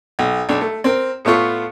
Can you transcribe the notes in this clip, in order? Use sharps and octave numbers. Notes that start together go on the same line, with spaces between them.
B1
B1 D4
A3
C4 A#4
A2 A3 B3 F4 C#6